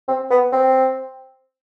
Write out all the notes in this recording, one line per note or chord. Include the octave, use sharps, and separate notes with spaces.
C4
B3
C4